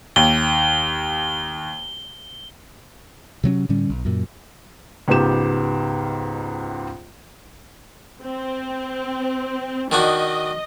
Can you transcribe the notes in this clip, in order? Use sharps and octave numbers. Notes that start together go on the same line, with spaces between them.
D#2 G7
C3 F#3 C4 C#4
A2 D3 G3 C#4
B1
F#2 A#2
C#2 G#2 B3 G4 E7
C4
D#3 D4 F#4 D#5